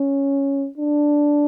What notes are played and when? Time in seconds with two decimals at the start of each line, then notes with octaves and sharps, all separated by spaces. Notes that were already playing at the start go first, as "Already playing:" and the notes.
Already playing: C#4
0.78 D4